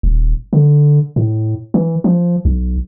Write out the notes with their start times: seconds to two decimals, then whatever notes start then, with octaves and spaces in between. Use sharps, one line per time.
0.03 D#1
0.53 D3
1.16 A2
1.74 E3
2.04 F3
2.45 B1